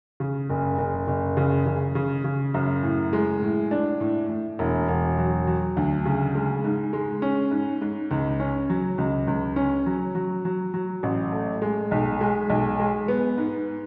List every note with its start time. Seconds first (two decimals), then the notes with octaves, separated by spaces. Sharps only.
0.20 C#3
0.49 F#1
0.78 F#1
1.07 F#1
1.37 C#3
1.66 C#3
1.95 C#3
2.24 C#3
2.54 F#2
2.83 A2
3.13 G#3
3.42 A2
3.71 D4
4.00 A2
4.29 A2
4.59 E1
4.88 E1
5.18 F#3
5.47 F#3
5.77 D2
6.05 C#3
6.35 G#3
6.64 G#2
6.93 G#3
7.22 C#4
7.51 G#2
7.82 G#2
8.11 C#2
8.40 C#4
8.70 F#3
8.98 C#2
9.28 C#2
9.56 C#4
9.86 F#3
10.15 F#3
10.45 F#3
10.74 F#3
11.03 A1
11.32 A3
11.62 G#3
11.91 B1
12.21 G#3
12.50 B1
12.79 G#3
13.08 B3
13.38 G#2